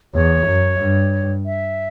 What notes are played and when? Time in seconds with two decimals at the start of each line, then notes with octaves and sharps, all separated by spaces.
0.14 E2 C#5
0.47 F#2
0.80 G2
1.46 E5